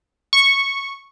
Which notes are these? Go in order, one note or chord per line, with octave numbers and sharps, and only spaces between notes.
C#6